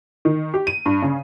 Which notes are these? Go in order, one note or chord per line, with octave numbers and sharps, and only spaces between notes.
D#3
G4
D#7
G2
C#3